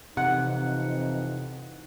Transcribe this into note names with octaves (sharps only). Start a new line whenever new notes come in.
F2 C3 E3 D#4 F#5